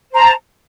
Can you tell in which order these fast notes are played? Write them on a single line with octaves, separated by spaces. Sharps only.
C5 A#5 A5